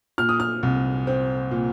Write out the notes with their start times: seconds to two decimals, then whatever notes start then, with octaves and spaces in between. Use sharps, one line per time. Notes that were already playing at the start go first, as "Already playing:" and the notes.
0.18 A#2 F6
0.29 D#6
0.40 F6
0.63 C2
1.07 C4
1.51 A#2